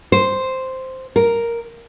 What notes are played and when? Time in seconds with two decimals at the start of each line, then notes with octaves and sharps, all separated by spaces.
0.12 C5
1.16 A#4